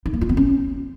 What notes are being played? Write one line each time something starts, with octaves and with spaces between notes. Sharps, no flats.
D#4
A#3
F4
B3
C#4